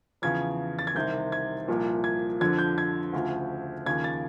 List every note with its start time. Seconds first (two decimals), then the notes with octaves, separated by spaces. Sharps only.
0.22 E2 C#3 F3 G#6
0.79 A6
0.87 G#6
0.95 C2 C3 D#3 G6
1.32 G#6
1.68 C2 A#2 F3
2.04 G#6
2.40 F2 D3 F3 G#6
2.59 G6
2.78 G#6
3.13 D2 C#3 F3
3.86 D#2 C#3 F3 G#6
4.04 A6